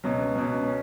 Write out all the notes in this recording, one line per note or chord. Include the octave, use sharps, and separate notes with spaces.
C#2 B2 F#3
C#2 B2 F#3
C#4